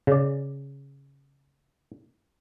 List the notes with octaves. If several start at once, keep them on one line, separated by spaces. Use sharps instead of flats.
C#3 D5